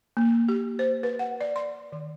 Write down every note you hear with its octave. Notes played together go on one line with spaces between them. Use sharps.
A#3
G4
C5
B4
F#5
D5
C6
D#3